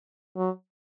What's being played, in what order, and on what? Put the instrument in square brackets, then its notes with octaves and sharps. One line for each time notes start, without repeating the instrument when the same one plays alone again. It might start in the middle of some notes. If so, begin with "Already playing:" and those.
[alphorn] F#3